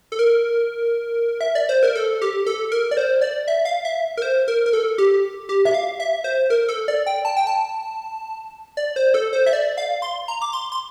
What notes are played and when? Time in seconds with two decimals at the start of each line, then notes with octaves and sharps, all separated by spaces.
0.12 A4
0.19 A#4
1.41 E5
1.55 D5
1.69 C5
1.83 A#4
1.96 A4
2.21 G4
2.46 A4
2.72 A#4
2.91 D5
2.97 C5
3.21 D5
3.48 E5
3.65 F5
3.85 E5
4.17 A#4
4.22 C5
4.48 A#4
4.66 A#4
4.73 A4
4.98 G4
5.49 G4
5.65 E5
5.74 F5
6.00 E5
6.24 C5
6.50 A#4
6.69 A4
6.88 D5
7.06 G5
7.25 A5
7.37 G5
7.47 A5
8.77 D5
8.96 C5
9.14 A4
9.33 C5
9.46 E5
9.53 D5
9.77 F5
10.02 C6
10.28 A#5
10.42 D6
10.53 C6
10.72 C6